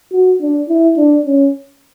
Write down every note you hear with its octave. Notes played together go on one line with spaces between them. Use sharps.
F#4
D4
E4
D4
C#4